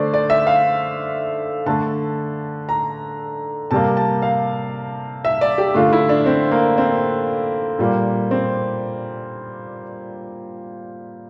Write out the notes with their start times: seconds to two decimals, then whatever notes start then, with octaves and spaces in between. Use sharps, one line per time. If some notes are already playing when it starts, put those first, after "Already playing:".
Already playing: D3 A3 C5 D5
0.14 D5
0.30 E5
0.47 F5
1.66 D3 A3 A5
2.69 A#5
3.71 C3 G3 A#3 A5
3.97 A5
4.22 F5
5.25 E5
5.41 D5
5.58 G4
5.74 D3 A3 F4
5.93 E4
6.09 D4
6.26 C4
6.51 A#3
6.78 C4
7.79 A#2 G3 A#3
8.31 C4